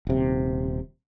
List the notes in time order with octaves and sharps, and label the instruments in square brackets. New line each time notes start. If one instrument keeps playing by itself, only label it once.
[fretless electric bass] D#1 C3